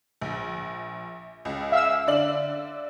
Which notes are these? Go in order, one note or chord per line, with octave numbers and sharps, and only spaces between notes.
A#1
C#2
E5 F5 E6
D3 D5 F#7